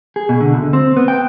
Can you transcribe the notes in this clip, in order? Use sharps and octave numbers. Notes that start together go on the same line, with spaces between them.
G#4
B2
D3
D2
C4
B3
G5